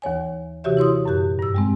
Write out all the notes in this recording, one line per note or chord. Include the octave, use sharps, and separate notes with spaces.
D#2 E3 C#5 G#5
C3 E3 F#4 G4 C#5 E5
E4 C#5 C6 D#6
F#2 A#2 G4 F#6
G2 E6
G3 G#3 C4